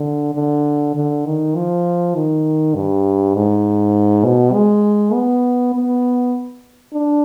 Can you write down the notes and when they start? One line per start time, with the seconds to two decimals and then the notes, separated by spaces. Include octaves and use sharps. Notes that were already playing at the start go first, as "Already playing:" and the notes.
Already playing: D3
0.35 D3
0.95 D3
1.26 D#3
1.55 F3
2.15 D#3
2.75 G2
3.35 G#2
4.25 B2
4.54 G#3
5.14 B3
5.75 B3
6.94 D4